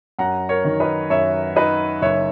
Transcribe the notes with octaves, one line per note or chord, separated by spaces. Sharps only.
F#2 F#5 A#5
A#4 C#5
D#3
B4 D#5
F#2 C#5 E5
D#4 B4 D#5
F#1 C#5 E5